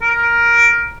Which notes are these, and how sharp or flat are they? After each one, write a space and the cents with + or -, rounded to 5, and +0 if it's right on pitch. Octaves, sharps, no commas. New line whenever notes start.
A#4 +10